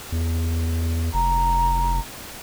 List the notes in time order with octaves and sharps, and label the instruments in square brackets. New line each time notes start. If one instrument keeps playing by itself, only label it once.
[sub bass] E2
[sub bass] F1 [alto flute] A#5